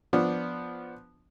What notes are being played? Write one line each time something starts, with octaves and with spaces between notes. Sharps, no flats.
F3 B3 D4